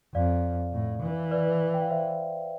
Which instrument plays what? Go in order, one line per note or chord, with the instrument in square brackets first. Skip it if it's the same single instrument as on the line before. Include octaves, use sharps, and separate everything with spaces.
[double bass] F2 [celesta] D5 F5
[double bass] A2
E3
[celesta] B4 D5
G5
F5
C5 E5